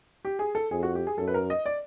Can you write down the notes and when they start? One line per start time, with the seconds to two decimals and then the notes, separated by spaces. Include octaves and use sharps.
0.25 G4
0.39 G#4
0.55 A4
0.71 F2 G#4
0.83 F#4
0.95 G4
1.07 G#4
1.18 F#2 A4
1.27 B4
1.34 A#4
1.50 D#5
1.66 D5